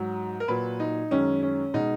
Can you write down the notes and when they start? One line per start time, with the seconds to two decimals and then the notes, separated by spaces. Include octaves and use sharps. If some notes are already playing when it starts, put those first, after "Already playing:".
Already playing: G#2 F#3
0.40 A#4
0.48 A#2 F#3 B4
0.80 D#4
1.11 F#2 D#3 G#3 C#4
1.43 C#4
1.74 B2 G#3 D#4